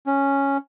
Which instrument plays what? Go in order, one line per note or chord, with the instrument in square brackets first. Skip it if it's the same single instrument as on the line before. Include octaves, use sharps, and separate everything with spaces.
[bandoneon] C#4